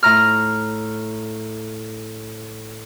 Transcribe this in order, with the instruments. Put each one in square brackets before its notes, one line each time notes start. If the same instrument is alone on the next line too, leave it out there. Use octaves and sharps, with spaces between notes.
[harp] A2 A#5 F6